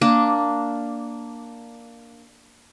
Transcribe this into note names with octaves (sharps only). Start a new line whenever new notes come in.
A#3 D4